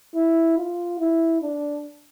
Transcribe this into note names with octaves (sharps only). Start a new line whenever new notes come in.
E4
F4
E4
D4